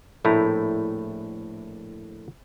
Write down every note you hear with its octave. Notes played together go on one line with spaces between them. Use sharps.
A#1 A2 A3 E4 A#5